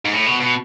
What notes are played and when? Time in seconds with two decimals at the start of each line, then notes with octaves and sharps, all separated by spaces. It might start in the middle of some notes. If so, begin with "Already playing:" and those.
0.05 G#2
0.13 A2
0.26 B2
0.40 B2